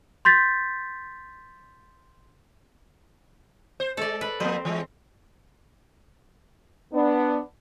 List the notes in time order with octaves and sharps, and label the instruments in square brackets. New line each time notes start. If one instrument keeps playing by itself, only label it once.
[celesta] C6 G6 A6 B6
[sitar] C5
[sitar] G#3 [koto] A4 D5
[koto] B4
[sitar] F3 A#3 [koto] C4
[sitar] E3 G#3
[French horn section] B3 D4